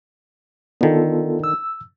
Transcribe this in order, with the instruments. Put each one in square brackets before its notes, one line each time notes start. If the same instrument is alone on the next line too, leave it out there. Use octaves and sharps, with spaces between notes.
[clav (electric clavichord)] D3 D#3 [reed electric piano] B3 F4 A4
[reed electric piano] E6